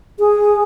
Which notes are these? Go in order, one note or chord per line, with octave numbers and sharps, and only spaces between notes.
G#4